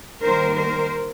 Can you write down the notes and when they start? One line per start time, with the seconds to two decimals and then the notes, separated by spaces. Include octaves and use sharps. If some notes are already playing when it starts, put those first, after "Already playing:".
0.23 D#3 G3 A#3 A#4 C5
0.57 A#4 C5